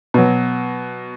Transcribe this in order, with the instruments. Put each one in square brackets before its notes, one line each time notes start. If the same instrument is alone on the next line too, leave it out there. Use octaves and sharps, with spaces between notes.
[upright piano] B2 F#3